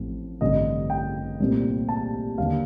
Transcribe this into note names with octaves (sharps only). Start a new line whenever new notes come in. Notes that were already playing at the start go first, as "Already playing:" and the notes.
Already playing: A1 A2 F3 A3 C4
A1 G2 D3 A3 C4 D#5
G5
C2 A#2 A3 C4
A5
D#2 D3 G3 F5